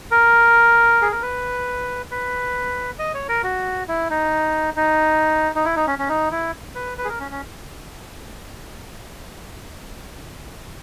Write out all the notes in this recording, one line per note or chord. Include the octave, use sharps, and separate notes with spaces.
A#4
G#4
A#4
B4
B4
D#5
C#5
A#4
F#4
E4
D#4
D#4
D#4
E4
D#4
C#4
C#4
D#4
E4
B4
B4
G#4
A#4
C#4
C#4